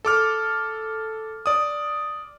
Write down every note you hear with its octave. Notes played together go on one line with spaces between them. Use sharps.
A4 D6 F6
D5 D#6